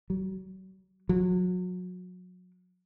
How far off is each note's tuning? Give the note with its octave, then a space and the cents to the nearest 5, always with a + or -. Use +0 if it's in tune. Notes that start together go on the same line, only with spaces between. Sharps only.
F#3 +35
F#3 -30